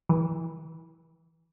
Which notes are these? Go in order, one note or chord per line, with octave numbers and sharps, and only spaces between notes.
E3